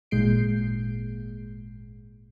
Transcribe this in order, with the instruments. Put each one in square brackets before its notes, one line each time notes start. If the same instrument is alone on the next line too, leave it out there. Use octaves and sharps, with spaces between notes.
[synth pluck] G#1 A#2 G#3 G6 C7 D7